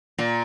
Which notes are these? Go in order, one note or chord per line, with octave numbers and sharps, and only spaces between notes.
A#2